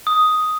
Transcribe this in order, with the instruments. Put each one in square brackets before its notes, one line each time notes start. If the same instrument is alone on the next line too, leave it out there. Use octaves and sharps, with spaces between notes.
[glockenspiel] D#6